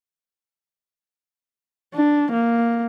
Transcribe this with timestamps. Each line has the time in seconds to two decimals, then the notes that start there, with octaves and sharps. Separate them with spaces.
1.94 D4
2.32 A#3